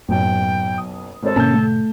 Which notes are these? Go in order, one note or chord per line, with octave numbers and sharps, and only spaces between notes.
F#1 B1 F#2 A2 G5
D#6
G#1 A4 C5
G#2 B2 D3 A#3 C#4 A5 G6
A3